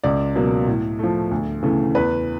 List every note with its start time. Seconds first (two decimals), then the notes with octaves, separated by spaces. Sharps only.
0.04 C#2 D5
0.36 B2 F#3 A#3
0.67 A2
0.99 F3 A3
1.31 D2
1.63 C#3 E3 A3
1.95 E2 B4